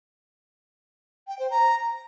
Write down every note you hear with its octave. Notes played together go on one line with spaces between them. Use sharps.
G5
C5
A#5